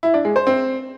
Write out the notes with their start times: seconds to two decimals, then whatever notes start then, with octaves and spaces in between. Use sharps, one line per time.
0.03 E4
0.14 D4
0.25 G#3
0.36 C5
0.47 C4